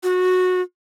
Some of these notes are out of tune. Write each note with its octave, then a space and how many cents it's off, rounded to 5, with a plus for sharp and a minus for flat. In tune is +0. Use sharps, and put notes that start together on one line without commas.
F#4 -15